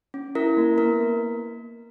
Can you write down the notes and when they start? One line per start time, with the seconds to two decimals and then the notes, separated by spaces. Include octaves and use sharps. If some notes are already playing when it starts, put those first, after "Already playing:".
0.14 C#4
0.35 E4 A#4
0.57 A#3
0.78 B3 A#4